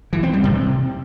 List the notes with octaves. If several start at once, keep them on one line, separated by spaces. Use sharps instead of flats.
E3
C4
G3
C3